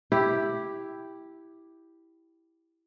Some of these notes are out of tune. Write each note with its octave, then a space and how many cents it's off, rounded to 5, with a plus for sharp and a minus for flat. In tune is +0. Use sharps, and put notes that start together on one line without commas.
E4 +0 G4 +0